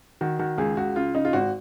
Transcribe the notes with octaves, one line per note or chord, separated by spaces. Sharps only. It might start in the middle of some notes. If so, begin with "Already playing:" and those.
D#3 F#4
D#3 F#4
C#2 G#4
C#2 F#4
C#3 F4
C#3 D#4
F4
G#1 F#4